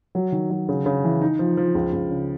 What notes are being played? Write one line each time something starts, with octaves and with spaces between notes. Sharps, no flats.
F#3
D#3
F#3
C#3
C#3
E3
D#4
F3
F3
C#2
C#2
C#3